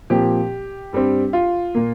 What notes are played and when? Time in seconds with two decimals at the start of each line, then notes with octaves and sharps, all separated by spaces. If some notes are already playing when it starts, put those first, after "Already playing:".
0.10 A#2 F3 C4 G4
0.93 G2 G3 C4
1.33 F4
1.75 A#2 A#3